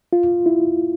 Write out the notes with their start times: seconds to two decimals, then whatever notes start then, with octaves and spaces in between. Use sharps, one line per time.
0.13 F4
0.46 E4